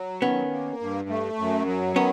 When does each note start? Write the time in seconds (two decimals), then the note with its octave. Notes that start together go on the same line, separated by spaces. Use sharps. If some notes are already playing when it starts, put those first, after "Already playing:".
Already playing: F#3
0.22 D#3 B3 C#4
0.51 A#3
0.80 G2
1.09 A3
1.39 F#2
1.66 F#3
1.95 D#3 B3 C#4